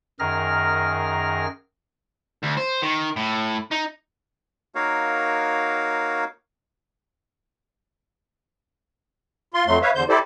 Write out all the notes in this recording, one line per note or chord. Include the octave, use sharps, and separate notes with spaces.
F#2 D#3 G#4 A#4 F6 A#6
D2
C5
D#3
A2
D#4
A#3 D#4 F#4 A#4 C#5 F5
F4 C6
F2 F#3 A3 C6
B4 C#5 E5 F5
E2 D3 C5 G6
E4 G4 A4 C5 D5